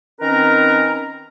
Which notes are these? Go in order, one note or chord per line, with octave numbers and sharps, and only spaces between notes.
D#3 C4 C#4 A#4 B4 A#5